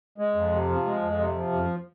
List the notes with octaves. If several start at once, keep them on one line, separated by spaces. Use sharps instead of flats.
G#3
F2
C3
F3
G#3
F2
C3
F3
F2